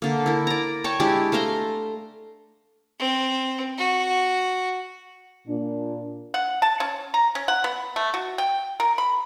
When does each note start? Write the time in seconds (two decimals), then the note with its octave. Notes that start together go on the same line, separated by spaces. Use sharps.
0.02 D3 A#3
0.26 E4 A#4
0.47 D5 A#5
0.84 C#5 G5 A5 C#6
1.00 G#3 D4 E4 G4
1.32 A3 F5 A#5 C6
2.99 C4
3.78 F#4
5.48 A#2 D4
6.34 F#5
6.62 A5
6.80 C#4
7.14 A#5
7.35 C#4
7.48 F#5
7.64 B3
7.96 A3
8.14 F#4
8.38 G5
8.80 A#4
8.98 B5